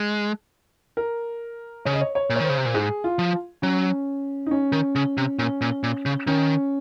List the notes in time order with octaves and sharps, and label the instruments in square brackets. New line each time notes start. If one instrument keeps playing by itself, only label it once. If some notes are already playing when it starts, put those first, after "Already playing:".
Already playing: [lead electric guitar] G#3
[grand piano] A#4
[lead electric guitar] C#3 [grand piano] C#5
[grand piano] D#5
C#5
C#5
[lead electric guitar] A#2
[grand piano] C#5
[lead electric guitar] D#3 [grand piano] C5
[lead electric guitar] C#3
C3
A#2
[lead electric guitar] G#2 [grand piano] G#4
[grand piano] F4
[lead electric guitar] F3
[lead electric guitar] F#3 [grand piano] C#4
[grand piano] D#4
C#4
[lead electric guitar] D#3
C#3
C3
[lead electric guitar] A#2 [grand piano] C#4
[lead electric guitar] A#2
A#2
C#3
[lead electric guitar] D#3 [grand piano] C#4